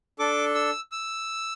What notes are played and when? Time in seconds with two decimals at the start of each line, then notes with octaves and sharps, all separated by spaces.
0.19 D4 A4 D6
0.55 E6
0.92 E6